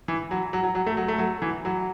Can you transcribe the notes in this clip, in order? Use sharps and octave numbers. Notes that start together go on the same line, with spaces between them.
E3
F#3
F#3
F#3
F#3
A3
F#3
A3
F#3
E3
F#3